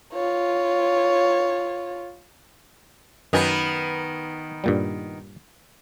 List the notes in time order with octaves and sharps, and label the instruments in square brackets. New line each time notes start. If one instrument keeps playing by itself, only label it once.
[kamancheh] F4 C#5
[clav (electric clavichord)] F#2 D#5 G#5 [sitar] D#3 B3
[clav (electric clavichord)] G2 A#2 G3